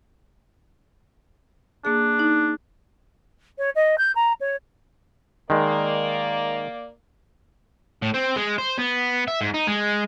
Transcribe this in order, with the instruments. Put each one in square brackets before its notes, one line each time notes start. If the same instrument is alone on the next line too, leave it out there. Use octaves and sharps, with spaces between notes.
[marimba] A#3 G#4 [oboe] D4
[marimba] D#4
[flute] C#5
D#5
G6
A#5
C#5
[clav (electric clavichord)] D#3 G#3 [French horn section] A#3 D5
[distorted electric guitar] A2
C4
G#3
C5
B3
E5
G#2
D#4
G#3